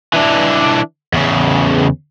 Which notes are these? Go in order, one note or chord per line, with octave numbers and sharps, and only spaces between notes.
E3 D4
E2 C#3